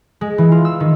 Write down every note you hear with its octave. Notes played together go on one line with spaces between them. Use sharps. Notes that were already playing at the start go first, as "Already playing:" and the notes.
G#3
E3
F4
E6
D#3